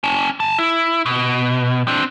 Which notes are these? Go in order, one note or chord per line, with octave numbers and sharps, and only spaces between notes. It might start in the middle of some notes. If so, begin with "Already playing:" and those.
C#4 A5
G#5 A5
E4
B2
C4 D4